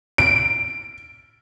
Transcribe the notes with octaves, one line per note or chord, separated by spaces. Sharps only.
D7